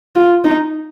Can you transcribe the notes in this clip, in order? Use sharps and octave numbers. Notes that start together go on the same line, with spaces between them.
F4
D#4